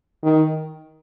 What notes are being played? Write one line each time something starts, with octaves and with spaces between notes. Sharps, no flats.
D#3